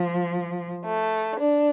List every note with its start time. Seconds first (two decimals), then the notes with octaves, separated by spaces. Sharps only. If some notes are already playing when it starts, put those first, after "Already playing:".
Already playing: F3
0.85 A3
1.39 D4